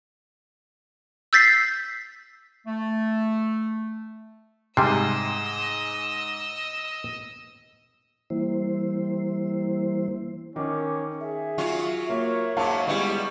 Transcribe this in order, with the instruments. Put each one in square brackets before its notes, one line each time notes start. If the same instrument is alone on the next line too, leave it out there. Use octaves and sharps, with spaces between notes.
[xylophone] E6 G6 A6 B6 C7
[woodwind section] A3
[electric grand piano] G#2 G#5 C7 [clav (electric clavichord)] C3 G3 [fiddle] D#5 E6
[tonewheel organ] E3 G3 A#3 E4 C5
[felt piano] D#3 [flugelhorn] C#4 [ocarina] D6
[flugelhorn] G#4 [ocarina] E5
[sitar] F#3 F4
[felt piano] A#3 [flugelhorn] C#5 [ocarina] E5
[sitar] G#2 F#3 [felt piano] F5 A5
[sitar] G3 B3 E4 [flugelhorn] G#3 [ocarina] C#6